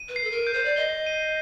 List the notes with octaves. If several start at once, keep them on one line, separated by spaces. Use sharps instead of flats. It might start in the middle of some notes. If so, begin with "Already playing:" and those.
Already playing: D#7
B4
C7
A4
A#4
G6
C5
D5
D#5 G7
D#7